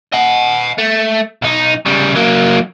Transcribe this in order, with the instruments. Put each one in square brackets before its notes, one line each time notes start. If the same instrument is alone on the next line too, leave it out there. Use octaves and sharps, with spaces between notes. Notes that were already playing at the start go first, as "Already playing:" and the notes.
[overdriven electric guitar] D#5 F#5
A3
B1 D#4
C#3 G3
F#3 A#3